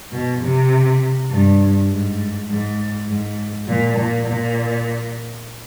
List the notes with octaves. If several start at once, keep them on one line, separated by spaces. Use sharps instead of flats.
B2
C3
G2
G#2
G#2
G#2
A#2
A#2
A#2